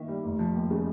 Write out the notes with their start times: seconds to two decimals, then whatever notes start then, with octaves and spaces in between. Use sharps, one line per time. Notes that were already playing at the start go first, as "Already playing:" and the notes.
Already playing: D#3 A#3 E5
0.08 G3
0.24 F1
0.39 F3
0.55 D#2
0.71 C#3